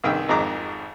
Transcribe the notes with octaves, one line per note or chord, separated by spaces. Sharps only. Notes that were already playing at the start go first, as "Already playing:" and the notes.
C2 G2 D#3 G#4 G5 E6
G#1 F2 D#3 G#4 A#5 D6